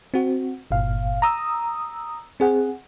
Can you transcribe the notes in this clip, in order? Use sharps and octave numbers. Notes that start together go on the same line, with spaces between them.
C4 F#4
G1 A#2 F5
A#5 D#6 E6
C4 G#4 F#5